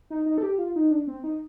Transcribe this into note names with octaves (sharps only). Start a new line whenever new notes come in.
D#4
D#4
A4
G4
F4
D#4
D4
C4
D#4